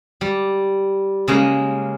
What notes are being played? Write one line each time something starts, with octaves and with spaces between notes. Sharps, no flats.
G3
C#3 G#3 A#3